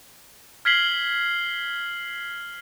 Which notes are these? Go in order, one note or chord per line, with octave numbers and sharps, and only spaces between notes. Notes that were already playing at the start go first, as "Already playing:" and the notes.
F6 G#6 B6 C7 F#7 G7